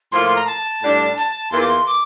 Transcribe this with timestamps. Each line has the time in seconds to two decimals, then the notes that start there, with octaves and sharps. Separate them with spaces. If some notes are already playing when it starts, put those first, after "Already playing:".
0.12 A2 F3 A#3 F4 C6
0.24 C6
0.36 A#5
0.47 A5
0.82 A2 G3 D4
1.17 A5
1.52 E2 E3 A#3 F4 A#4 C6
1.60 D6
1.67 C6
1.87 D6